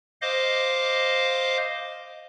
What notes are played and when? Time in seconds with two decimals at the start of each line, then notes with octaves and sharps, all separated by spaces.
0.22 C5 D#5 F5 D6